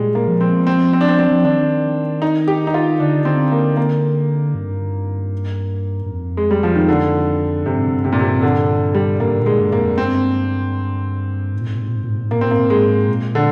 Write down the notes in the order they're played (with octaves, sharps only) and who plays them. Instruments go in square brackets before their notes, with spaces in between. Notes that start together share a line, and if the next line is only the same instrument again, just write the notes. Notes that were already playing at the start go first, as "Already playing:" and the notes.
Already playing: [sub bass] A#2 [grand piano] G3 G#3
[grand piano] A#3
[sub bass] F3
[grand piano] C4
C4
C4
D4
C4
C4
[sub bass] F3
[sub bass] D#3 [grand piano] D4
[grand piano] D#4
G4
D#4
F4
[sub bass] D3 [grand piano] D4
[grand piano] C4
A#3
A#3
[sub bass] G2
G2
F2
[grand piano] G#3
G3
F3
D#3
D3
[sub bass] G2 [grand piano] C3
[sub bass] G#2
G2
[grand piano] C3
A#2
C3
D3
G3
[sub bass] G#2 [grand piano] A#3
[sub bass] G#2
A#2
[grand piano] G#3
[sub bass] G2
[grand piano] A#3
[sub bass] F2
[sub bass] G2 [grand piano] C4
[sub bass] G#2
A#2
G#2
A#2
G#2
A#2
G#2
A#2
G#2
A#2
G#2
[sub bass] A#2 [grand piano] A#3
[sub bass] G#2
[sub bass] A#2 [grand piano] C4
[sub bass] G#2 [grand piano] A#3
[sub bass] A#2
[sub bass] G#2 [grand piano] G#3
[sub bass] A#2
[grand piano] D3